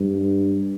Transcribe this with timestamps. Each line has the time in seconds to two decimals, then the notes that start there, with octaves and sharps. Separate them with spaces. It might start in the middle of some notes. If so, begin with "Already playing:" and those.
Already playing: G2